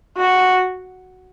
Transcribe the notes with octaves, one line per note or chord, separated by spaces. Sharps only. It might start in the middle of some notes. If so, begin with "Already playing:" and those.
F#4